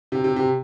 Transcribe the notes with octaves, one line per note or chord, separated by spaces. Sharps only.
C3
C3
C3